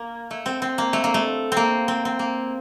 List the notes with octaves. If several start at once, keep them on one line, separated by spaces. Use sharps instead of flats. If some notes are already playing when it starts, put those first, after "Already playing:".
Already playing: A#3
A3
C4
C4
A#3
A3
A#3
A3
A#3 C4
C4
C4
A#3